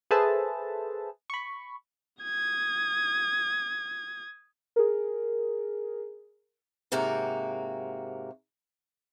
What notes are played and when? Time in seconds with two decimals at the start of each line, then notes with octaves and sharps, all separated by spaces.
0.11 G#4 A4 B4 C5 E5 A5
1.30 B5 C#6
2.23 D#6 G#6
4.76 G#4 A#4
6.92 G#2 C3 A#3 F#4